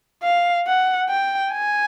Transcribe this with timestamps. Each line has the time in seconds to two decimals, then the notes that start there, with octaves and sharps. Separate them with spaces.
0.23 F5
0.67 F#5
1.09 G5
1.52 G#5